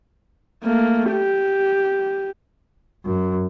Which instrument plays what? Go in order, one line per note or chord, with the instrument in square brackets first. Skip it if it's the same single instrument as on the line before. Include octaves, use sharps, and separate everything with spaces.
[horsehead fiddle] A3 A#3
G4
[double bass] F#2